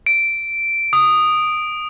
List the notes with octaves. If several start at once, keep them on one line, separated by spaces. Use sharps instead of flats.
D7
D#6